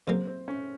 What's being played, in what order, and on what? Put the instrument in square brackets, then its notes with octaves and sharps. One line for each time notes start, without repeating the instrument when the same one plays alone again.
[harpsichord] C#3 F#3 A#3 [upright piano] C4
[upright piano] C4
C#4